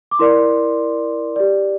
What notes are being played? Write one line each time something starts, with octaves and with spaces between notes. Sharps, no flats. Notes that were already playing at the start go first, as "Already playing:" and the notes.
D6
E4 A#4 D5 C6
G4 D5